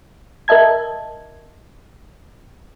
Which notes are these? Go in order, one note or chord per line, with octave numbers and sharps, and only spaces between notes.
A#4 D#5 E5 A5 G#6